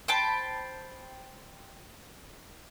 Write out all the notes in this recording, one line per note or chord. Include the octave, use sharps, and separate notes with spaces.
C5 G5 A5 B5